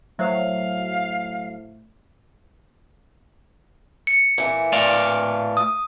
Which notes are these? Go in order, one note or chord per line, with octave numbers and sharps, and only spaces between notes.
A2 F#3 C5 E5 F5
C#7
A#2 E3
A2 D5 F5
D#6